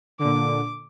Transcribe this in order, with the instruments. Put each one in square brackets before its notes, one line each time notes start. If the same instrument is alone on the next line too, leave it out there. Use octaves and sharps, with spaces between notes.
[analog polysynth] A#2 D3 [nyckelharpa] D6